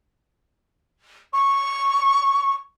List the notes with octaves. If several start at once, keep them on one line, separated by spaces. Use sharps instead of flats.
C#6